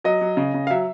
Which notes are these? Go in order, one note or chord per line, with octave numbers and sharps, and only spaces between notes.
F#3 D#5
F#3
C#3
C#3
F5
F#3 E5